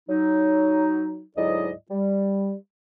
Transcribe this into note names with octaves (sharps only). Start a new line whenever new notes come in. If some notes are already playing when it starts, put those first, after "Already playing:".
F#3 D#4
D2 G#2 F#3 E4 D5 D#5
G3